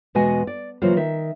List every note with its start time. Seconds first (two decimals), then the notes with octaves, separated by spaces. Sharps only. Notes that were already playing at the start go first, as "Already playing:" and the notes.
0.15 E2 B2 G#3 F#4 D#5 G#5
0.47 D5
0.82 C#3 E3 F#3 A#3 F4 C5
0.97 D#3 E5